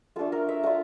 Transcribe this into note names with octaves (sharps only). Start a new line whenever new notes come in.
A3 D4 F4 A4
A#4
E5
A3 D4 F4 F5